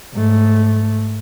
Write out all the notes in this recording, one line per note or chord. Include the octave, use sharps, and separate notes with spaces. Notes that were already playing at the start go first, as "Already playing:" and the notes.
G#2 A3